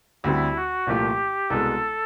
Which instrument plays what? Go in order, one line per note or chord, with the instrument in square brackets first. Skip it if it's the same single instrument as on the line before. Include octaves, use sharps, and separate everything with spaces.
[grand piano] D2 D3 G3 C4 [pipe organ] E4
[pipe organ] F#4
[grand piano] C2 A#2 F3 A3 [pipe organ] G4
[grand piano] C2 B2 G#3 [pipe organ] A4